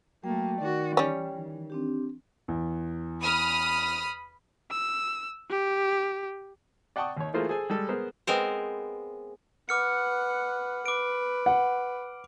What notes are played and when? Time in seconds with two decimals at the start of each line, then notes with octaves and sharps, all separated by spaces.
0.24 F#3 A3 A#3 G5
0.61 D#3 F#4 D5
0.97 E3 G3 C#4
1.38 D#3
1.70 C4 D4 G4
2.48 E2
3.22 B5 D#6 F6
4.71 E6
5.50 G4
6.96 D5 F#5 G5 A5 C#6 D#6
7.17 D#2 C#5
7.34 E3 A3 A#3 F4 G#4 C5
7.49 G#4 A4 C5 G#5
7.70 G3 G#3 A4
7.89 B3 G#4 A#4 C5
8.27 G#3 B3 C4 A#4 C5
9.69 B4 F#5 D6 F6 C#7
10.86 B4 D6 D7
11.46 F#5